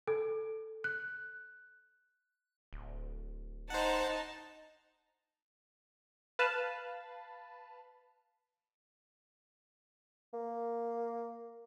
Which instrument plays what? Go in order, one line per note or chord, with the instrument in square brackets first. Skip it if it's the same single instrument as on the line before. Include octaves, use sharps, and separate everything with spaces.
[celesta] A4
F#6
[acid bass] D1
[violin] D#4 A5 [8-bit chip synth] C5 F#5
[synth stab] B4 F5 A5
[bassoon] A#3